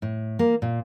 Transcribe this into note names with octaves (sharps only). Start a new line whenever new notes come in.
A2
A#3
A#2